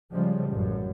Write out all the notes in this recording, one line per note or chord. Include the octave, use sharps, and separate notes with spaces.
C#3 F3 G3 G#3
A1 F#2